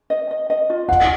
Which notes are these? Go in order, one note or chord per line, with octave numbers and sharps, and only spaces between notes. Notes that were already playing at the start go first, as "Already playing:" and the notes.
D#5
D#5
D#5
F4
F5 F#5